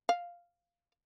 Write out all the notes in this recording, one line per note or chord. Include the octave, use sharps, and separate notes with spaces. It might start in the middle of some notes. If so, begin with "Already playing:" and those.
F5